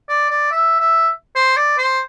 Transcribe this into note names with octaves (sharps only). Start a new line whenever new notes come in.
D5
D5
E5
E5
C5
D5
C5